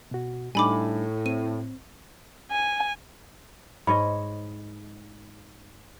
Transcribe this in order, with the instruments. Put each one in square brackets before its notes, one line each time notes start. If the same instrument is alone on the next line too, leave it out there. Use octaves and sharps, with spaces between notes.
[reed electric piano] B2 F#4
[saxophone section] A2 [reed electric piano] G3 D4 D#4 [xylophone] G#5 B5 D6
[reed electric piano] C4 [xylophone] D#7
[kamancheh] G#5
[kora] G#2 C#5 D#5 [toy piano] B5